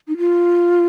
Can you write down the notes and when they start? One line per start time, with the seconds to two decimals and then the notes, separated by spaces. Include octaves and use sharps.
0.08 D#4
0.18 F4